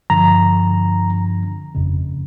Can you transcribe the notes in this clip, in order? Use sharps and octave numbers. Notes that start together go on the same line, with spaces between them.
G2 D3 F3 A#5
G1 F2 C#3